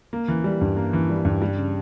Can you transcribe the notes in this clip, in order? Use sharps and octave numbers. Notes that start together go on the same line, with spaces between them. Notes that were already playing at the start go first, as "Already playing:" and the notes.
A#3
E3
G3
G2
A#3
E3
G3
G2
G3
C#3